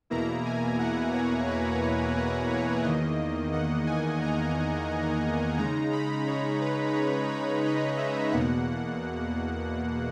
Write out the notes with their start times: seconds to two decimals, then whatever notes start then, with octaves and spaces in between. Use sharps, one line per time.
0.10 E2 B2 A#3 E4 A#5
0.45 G#5
0.79 F#5
1.13 C#5
1.48 B4
1.81 C#5
2.15 F#5
2.50 C#5
2.84 E2 D#3 A#3 D#5
3.52 F#5
3.87 G#5
4.21 A#5
5.58 C#3 G#3 D#4 A#5
5.92 B5
6.27 C#5
6.61 B4
6.94 C#5
7.29 C#5
7.64 D#5
7.97 E5
8.32 E2 B2 A#3 F#5